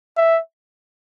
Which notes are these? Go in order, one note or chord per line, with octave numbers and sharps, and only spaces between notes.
E5